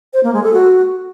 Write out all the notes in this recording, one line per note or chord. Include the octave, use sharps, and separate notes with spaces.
C5
A#3
G#3
A4
F#4